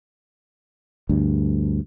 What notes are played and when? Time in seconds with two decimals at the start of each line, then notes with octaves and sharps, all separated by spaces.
1.09 D2 G2